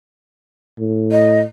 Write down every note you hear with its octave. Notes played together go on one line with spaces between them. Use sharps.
A2
D#5